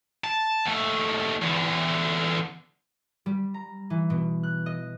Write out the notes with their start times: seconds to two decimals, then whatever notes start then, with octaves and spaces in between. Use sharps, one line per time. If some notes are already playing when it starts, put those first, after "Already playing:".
0.24 A5
0.66 D#2 A3
1.42 E2 D3
3.26 G3
3.54 A#5
3.90 E3
4.10 B2
4.43 F#6
4.66 D#5